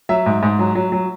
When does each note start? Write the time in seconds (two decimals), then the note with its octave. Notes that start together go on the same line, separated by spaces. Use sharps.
0.09 F#3 E5
0.26 G#2
0.43 G#2
0.59 F#3
0.75 F#3
0.92 F#3